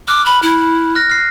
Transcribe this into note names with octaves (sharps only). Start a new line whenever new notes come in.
D6 F6 F#6
B5
E4
F6 F#6 A#6
F6 C7